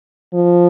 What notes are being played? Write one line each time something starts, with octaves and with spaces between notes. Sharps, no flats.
F3